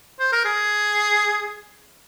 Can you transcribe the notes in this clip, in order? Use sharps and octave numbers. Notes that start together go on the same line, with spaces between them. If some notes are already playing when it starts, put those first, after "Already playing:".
C5
A#4
G#4